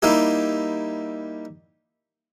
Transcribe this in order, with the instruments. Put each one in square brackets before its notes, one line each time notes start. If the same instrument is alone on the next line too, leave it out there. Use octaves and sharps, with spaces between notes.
[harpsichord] G3 A#3 D#4 E4 G4